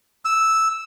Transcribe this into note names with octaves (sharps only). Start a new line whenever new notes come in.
E6